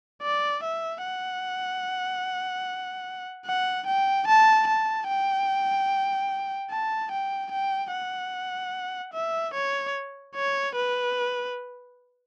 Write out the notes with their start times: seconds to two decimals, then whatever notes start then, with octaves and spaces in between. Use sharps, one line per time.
0.22 D5
0.63 E5
1.03 F#5
3.46 F#5
3.87 G5
4.27 A5
4.67 A5
5.08 G5
6.71 A5
7.11 G5
7.51 G5
7.92 F#5
9.13 E5
9.54 C#5
10.35 C#5
10.75 B4